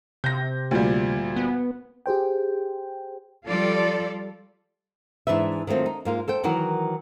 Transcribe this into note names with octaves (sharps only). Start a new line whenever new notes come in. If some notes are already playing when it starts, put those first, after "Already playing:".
C3 G6 A#6
D2 A#2 G3
B3
G4 G#4 C5 G5
F3 G3 F4 A4 D5
G#2 E3 D4 B4 E5
D#3 F#3 A3 C4 F4
D#4
G#2 A#3 F4
A4 C5 G5
D#3 E3 F#3 F#4 A#4